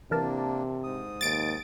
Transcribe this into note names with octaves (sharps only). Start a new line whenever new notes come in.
C3 E3 A#3 D4 A#4 A5
G#2 D#6
D#2 A6 D7